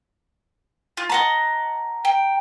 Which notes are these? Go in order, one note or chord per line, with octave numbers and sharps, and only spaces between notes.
F4
D#5 F#5 A5 A#5
G5